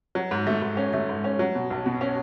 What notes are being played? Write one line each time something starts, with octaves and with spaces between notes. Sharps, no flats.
F#3
G#2
A3
G#2
C#4
A3
G#2
C#4
F#3
B2
B1
B2
C#4